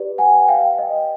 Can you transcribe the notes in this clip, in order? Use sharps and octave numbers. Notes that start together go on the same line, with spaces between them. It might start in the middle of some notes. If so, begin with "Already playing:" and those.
Already playing: G4 B4 D5
F#5 G#5
F5 G5
D#5